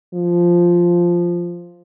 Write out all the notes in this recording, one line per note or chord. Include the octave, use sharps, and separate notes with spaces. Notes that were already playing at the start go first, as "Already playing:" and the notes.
F3